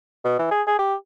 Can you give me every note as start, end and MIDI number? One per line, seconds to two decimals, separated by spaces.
0.24 0.39 47
0.39 0.51 52
0.51 0.62 68
0.67 0.76 68
0.79 0.95 67